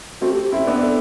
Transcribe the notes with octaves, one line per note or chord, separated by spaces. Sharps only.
A3 C4 F#4
G4
G4
C4 E4 A4
D5
B3 D4
E5
A4